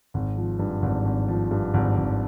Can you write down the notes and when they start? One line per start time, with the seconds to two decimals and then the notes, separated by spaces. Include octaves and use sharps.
0.14 G#1
0.37 F3
0.59 G2
0.82 G#1
1.05 G#1
1.28 F3
1.51 G2
1.74 G#1
1.97 G#1